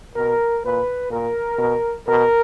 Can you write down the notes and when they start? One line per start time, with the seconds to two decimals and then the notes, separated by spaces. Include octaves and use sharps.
0.15 B2 A#4
0.63 A#2 B4
1.11 A#2 A#4
1.59 B2
2.07 B2 A#4